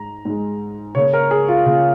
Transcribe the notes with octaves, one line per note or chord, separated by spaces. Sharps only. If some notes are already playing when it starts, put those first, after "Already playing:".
Already playing: G#2 G#3 A#5
G#2 G#3
C#3 A#3 C#5
A#4
G#4
F4
C#3 A#3 F4